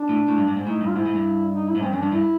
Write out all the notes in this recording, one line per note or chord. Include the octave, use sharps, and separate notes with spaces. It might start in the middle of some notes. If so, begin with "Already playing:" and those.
Already playing: D4
A2
A2
G2
G2
G#2
A2 D#4
G2
F4
G#2 E4
G#2
G2
D#4
E4
G#2
G2 C4
F#2 C#4
G2 D4
G2 E4